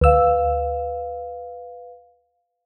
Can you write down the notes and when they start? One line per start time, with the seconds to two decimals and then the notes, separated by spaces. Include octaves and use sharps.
0.01 D2 B4 F5 E6